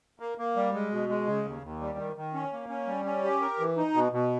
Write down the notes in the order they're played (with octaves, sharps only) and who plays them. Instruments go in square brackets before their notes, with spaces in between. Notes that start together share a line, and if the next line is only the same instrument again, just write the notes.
[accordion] A#3
A#3
G3
G#3
B2
G#3
C#3
D#2
D#2
G3
D#3
D#3
C#4
A#3
C#4
G3
C#4
G4
A#4
E3
D#4
B2
B2